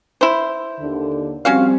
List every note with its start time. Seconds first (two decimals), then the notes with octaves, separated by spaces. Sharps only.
0.21 E4 C5
0.80 D#2 D3
1.45 F3 G3 C4 C#4 F#4 F5